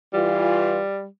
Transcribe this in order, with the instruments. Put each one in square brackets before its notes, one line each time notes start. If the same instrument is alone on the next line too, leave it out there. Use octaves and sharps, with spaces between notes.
[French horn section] E3 F4 [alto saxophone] G3